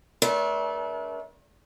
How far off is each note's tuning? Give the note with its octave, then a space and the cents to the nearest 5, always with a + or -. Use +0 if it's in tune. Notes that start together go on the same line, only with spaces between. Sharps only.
A3 -30 D4 -40 A#4 +45